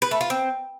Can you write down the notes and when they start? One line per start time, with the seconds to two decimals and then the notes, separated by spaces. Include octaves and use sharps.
0.02 B4
0.11 A3
0.21 F4
0.30 C4